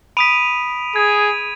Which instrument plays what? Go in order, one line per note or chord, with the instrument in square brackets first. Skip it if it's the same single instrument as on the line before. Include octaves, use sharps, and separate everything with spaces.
[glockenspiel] B5 D#6 B6 [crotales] D7 D#7 F7
[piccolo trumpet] G#4 [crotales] G#6